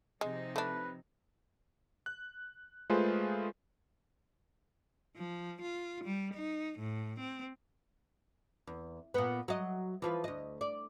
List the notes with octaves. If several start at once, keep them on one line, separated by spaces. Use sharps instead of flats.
C3 F3 G#3 D#4
A3 D4 B4
F#6
G#3 A3 F4 G#4 B4 C5
F3
F4
G3
D#4
A2
C4
E2
A#2 B3
F#3 D#5
E3 F3 B4
D2 D#5
D5